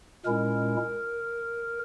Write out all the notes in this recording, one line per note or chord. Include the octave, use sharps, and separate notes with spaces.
A#2 G#3 C#4 E4 A#4